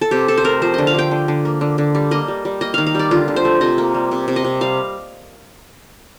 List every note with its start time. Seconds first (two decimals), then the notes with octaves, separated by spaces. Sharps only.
0.01 A4
0.11 C3 G4
0.28 C3 A4
0.38 C5
0.44 A3 A#4
0.62 F3 C5
0.74 D3 D#5
0.87 F5
0.95 D3 G5
1.11 D3
1.28 D3
1.45 A#3
1.61 D3
1.78 D3
1.95 G3
2.11 A#3 D#5
2.28 G3
2.45 G3
2.61 A#3 D#5
2.74 D#3 F5
2.87 F5
2.95 G3 D5
3.11 D3 F4
3.28 D3
3.36 C5
3.45 A3
3.61 C3 D#5
3.78 A#3
3.94 G3
4.11 C3
4.28 C3
4.36 D#5
4.44 C3
4.61 G3 F5